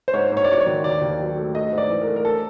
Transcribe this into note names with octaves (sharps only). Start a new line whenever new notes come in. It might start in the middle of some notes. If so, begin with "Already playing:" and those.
C5
G#2 C#5
G#2
C#5
D5
F#3 C#5
C#5
D#3
D#2 D5
D#2
F#3
A3
A3 D#5
G#2
D5
E3
A#4
A3
A#4
A4